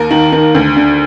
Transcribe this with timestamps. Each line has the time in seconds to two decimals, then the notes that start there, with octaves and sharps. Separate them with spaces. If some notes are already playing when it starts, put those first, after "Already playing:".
Already playing: D#2 A#4
0.11 D#3
0.32 D#3
0.55 D2
0.77 D3